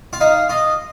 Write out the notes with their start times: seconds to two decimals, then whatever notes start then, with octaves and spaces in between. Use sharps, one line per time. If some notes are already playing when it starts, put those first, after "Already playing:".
0.13 F4
0.20 D#4 F5
0.50 F4 D#5